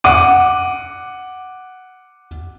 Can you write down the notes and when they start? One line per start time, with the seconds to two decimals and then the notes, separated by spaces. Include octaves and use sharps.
0.04 F#5 D6 D#7